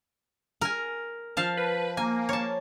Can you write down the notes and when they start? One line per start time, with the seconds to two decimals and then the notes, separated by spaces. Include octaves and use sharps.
0.61 A#4 G#5
1.37 F3 F5 A5
1.57 B4
1.97 A#3 G#5
2.29 C#5 A5